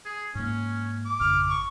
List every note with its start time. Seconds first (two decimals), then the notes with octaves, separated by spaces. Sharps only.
0.06 G#4
0.35 G#2 A#3 C#4
1.06 D6
1.20 G#1 F2 C#3 F6
1.49 C#6